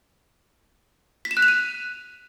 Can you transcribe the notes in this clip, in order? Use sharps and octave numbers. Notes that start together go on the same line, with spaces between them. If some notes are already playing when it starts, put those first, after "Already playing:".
B6
E7
F#6
F7
D#7